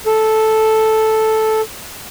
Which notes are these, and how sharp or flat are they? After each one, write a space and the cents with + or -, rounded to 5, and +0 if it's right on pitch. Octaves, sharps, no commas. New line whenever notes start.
A4 -5